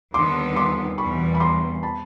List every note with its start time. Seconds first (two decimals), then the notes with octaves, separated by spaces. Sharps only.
0.14 D#2 D3 G3 B3 C6 D6
0.56 C6 D6
0.98 E2 B2 G3 B5 C#6
1.35 B5
1.40 A#5 C6
1.83 A5 B5